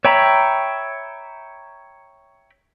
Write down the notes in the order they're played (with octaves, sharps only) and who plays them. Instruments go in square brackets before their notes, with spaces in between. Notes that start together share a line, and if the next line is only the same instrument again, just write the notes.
[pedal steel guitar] C#5 E5 G5 A#5 B5